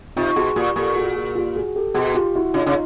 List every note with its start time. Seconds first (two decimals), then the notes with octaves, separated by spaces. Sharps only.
0.16 C3 D#4 F4
0.36 B2 F#4 G#4
0.56 A#2 F4 G4
0.76 A#2 G4 A4
0.96 F#4 G#4
1.16 F#4 G#4
1.35 F4 G4
1.56 F#4 G#4
1.75 G4 A4
1.94 B2 F#4 G#4
2.14 F4 G4
2.35 E4 F#4
2.54 C#3 D#4 F4
2.66 C#3